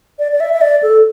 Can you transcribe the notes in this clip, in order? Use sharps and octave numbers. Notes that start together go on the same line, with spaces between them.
D5
D5
E5
E5
D5
A4